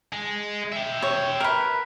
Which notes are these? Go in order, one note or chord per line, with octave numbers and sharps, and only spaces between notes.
G#3
E5 G5
C#5
A#4 B4